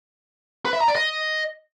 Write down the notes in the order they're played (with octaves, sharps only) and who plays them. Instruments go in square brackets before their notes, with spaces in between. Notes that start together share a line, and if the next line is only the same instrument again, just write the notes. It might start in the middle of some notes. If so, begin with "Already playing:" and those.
[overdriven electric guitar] B4
E5
A#5
D5
D#5